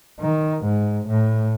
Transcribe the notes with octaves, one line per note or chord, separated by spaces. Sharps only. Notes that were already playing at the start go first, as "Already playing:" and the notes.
D#3
G#2
A2